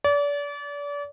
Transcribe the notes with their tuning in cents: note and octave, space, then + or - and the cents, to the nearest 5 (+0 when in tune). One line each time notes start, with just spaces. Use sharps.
D5 -35